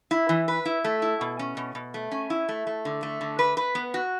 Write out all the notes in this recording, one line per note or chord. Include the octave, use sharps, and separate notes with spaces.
E4
E3
B4
E4
A3
E4
B2
C#4
B2
B2
A3
C#4
E4
A3
A3
D3
A3
D3
B4
B4
B3
F#4